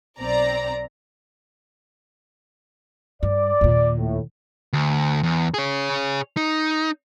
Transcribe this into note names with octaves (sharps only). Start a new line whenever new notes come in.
B1 C4 D5 A#5
G2 D5
D#2 A#2
A2
D2
E2
G#4 C#5
D#4